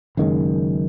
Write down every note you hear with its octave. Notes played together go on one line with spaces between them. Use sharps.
F#1 F#2 D#3 G#3